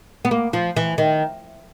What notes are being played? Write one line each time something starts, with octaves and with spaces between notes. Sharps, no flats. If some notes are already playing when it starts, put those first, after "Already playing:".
B3
A#3
F3
E3
D#3